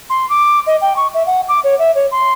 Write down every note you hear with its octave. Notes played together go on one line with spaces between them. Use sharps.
C6
D6
D#5
G5
C#6
E5
F#5
D6
C#5
E5
C#5
C6